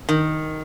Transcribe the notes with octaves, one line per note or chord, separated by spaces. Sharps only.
D#3